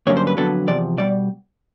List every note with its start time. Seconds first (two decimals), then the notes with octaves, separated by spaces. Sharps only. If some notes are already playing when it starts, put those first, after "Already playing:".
0.07 G2 D3 F#3 A#3 C#4 C#5
0.17 C5
0.27 B4
0.37 F2 D3 F#3 B3 A4
0.68 E2 C3 F3 D5
0.97 B2 G3 D5